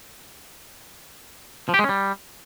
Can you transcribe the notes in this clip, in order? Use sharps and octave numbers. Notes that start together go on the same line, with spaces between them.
F3
G4
G#3
C#4
G3